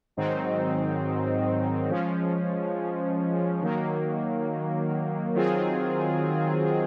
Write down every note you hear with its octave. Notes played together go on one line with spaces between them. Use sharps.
G#2 D#3 F#3 C4 D#4
F3 G#3 C#4
D#3 F#3 A#3
D#3 F#3 C4 F4 G#4